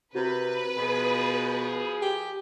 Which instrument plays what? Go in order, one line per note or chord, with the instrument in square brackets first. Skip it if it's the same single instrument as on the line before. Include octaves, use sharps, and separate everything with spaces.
[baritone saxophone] C3 [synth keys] F#4 A#4 A#5 [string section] B4
[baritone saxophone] B2 [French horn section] F3 G#4
[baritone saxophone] G4